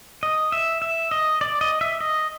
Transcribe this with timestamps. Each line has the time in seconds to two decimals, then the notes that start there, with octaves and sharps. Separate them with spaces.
0.23 D#5
0.52 E5
0.82 E5
1.11 D#5
1.41 D5
1.61 D#5
1.81 E5
2.00 D#5